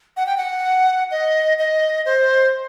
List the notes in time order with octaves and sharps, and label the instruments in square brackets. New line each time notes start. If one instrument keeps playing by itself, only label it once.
[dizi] F#5
G5
F#5
D#5
D#5
C5